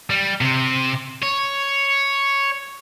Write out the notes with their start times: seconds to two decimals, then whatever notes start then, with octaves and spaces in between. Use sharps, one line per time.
0.10 G3
0.41 C3
1.23 C#5